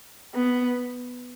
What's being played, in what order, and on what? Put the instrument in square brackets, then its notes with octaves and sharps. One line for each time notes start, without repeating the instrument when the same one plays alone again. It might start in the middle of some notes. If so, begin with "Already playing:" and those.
[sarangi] B3